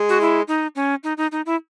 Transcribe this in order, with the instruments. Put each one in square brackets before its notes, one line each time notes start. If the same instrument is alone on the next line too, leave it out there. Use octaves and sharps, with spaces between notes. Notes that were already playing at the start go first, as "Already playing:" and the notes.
Already playing: [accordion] G#3
[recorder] F#4
E4
D#4
C#4
D#4
D#4
D#4
E4